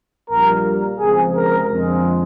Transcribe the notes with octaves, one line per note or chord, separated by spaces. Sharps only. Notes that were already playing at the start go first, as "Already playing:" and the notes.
A#1 A#2 G3 A#3 A#4
C#2 C3 F3 G#3 G#4
A#4
F2 D3 F3 G#3